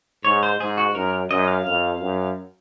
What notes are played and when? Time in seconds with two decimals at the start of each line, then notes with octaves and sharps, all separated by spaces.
0.25 G#2 C#5
0.43 C5
0.60 G#2 G#4
0.78 F#4
0.95 F#2 A#4
1.30 F#2 D#5
1.48 F5
1.66 F2
2.01 F#2